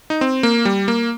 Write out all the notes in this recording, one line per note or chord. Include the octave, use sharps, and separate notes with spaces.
D#4
C4
A#3
G3
A#3